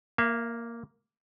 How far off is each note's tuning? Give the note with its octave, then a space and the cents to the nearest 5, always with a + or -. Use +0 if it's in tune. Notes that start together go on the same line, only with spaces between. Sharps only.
A#3 +0 E5 +40